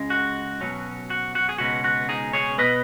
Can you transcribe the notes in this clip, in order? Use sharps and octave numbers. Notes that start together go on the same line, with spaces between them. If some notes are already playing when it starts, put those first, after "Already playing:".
Already playing: C#2 C#3 G#3
F#4
B2 F#3 C#4
F#4
F#4
G#4
C#2 B2 G#3 B3 F#4
F#4
D#4 G#4
G#4 C#5
B2 B3 B4 D#5